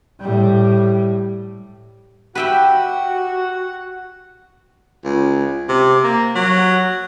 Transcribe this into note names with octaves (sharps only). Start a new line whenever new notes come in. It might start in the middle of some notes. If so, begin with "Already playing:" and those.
A2 G3
F#4 G4 B4 E5 F#5 G5
C#2
C3
A#3
F#3